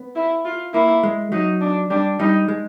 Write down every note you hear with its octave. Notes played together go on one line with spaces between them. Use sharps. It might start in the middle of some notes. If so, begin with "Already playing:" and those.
Already playing: B3
E4
F4
A#3 E4
G#3
F#3 D#4
D4
G3 D4
G3 D#4
G#3